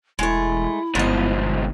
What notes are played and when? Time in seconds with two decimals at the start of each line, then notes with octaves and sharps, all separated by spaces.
0.19 E1 G#3 A3 E4
0.95 G1 G#2 B2 F3 D#5